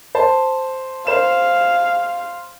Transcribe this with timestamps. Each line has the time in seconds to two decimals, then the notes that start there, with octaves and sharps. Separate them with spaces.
0.15 C5 A5
1.07 C5 F5 E7